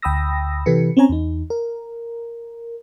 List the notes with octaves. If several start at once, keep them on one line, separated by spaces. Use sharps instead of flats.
D2 G5 B5 D#6 E6 A#6
C3 E3 G4 A4 B4 C#7
C4 C#4 C#5 G#5 A#5
E2 D#4
A#4